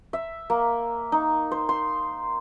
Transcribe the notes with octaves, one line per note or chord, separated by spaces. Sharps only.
E5
A#3
D#4
C5
C6